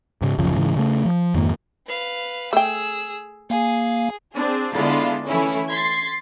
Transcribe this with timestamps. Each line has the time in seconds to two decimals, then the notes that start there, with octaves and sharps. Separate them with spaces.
0.22 G#2 C#3
0.38 D1 F#2 C#3 F3
0.56 G#2 C#3 E3
0.76 C#3 A3
1.05 F3
1.34 F2 G#2 D#3 A#3
1.87 B4 F5
2.53 A3 G#4 G5 E6
3.50 A#3 G#4 F5 G#5
4.34 C4 D4 G#4
4.73 D3 G#3 B3 D4 E4 F4
5.28 E3 A3 C#4 E4
5.69 C6 G#6 A6 B6 C7